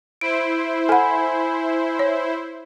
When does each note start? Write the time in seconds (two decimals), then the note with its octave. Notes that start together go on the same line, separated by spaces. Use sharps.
0.21 E4 C5 D7
0.89 A4 F#5 G#5 B5
1.99 C#5